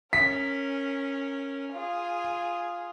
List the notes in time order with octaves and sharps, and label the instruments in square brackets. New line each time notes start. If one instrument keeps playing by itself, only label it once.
[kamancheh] C#4 A#4 [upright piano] B6
[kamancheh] F4 G#4